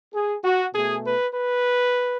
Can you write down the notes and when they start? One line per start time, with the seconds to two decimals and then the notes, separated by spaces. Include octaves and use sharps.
0.15 G#4
0.44 F#4
0.74 B2 A3 G#4
1.05 B4
1.34 B4